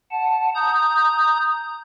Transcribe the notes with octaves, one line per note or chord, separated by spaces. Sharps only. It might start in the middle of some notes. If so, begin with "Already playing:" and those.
F#5 A5
A#5 D#6 G6